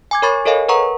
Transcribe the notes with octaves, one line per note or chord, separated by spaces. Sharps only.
G#5 D6 G#6
A#4 C#5 B5 C#6 A6
A4 A#4 C#5 D#5 F5 G#5
A#4 B4 F#5 A#5 C#6